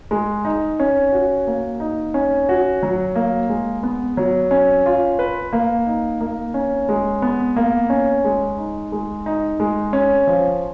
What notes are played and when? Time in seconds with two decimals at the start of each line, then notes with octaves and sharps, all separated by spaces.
0.11 G#3
0.45 D#4
0.80 C#4
1.12 F#4
1.47 A#3
1.80 D#4
2.14 C#4
2.49 F#4
2.83 F#3
3.16 A#3
3.49 G#3
3.83 B3
4.17 F#3
4.51 C#4
4.86 F4
5.19 B4
5.53 A#3
5.87 D#4
6.21 A#3
6.54 C#4
6.89 G#3
7.22 B3
7.57 A#3
7.90 C#4
8.24 G#3
8.58 D#4
8.92 G#3
9.26 D#4
9.60 G#3
9.93 C#4
10.27 F3